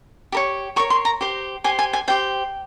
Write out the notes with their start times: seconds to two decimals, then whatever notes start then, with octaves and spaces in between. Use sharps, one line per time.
0.32 G4 A#4 C#5
0.76 G4 A#4 C#5 C#6
0.90 C6
1.05 A#5
1.21 G4 C5
1.64 G4 C5 G#5
1.79 G#5
1.93 G#5
2.08 G4 C5 G5